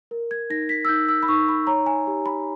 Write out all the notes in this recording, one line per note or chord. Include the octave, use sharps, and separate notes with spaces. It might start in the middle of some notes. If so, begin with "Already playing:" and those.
A#4
G#6
D#4 A#6
B6
E6
D#4 G6
E6
B5
D#4 C#6
B5
C#5 A#5
G#5
G4
B5